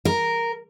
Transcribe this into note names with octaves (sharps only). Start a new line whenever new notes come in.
A#4